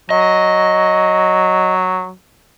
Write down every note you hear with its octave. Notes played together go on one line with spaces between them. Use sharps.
F#3 D#5